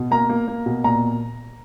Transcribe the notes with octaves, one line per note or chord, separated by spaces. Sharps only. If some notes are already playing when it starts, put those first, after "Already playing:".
Already playing: B2
A#3 A#5
A#3
A#3
B2
A#2 A#5